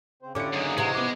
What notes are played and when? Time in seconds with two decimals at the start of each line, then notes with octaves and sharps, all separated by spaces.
0.22 C#3 C4 C5
0.35 D3 C#4 E4 F4 G4 D6 C#7
0.54 F#2 A#2 C#3 D#4 G#4
0.78 C3 E3 G#3 F#4
0.95 B3 D6